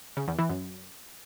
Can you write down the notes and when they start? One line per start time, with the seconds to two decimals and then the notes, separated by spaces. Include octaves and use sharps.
0.17 C#3
0.28 E2
0.39 E3
0.49 F#2